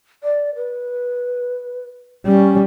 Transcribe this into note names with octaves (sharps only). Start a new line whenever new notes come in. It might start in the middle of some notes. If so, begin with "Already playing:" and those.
D5
B4
G3 C#4